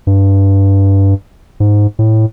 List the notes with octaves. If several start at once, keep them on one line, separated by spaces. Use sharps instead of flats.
G2
G#2
A2